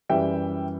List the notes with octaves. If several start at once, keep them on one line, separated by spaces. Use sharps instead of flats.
F#2 E3 G3 E5 G5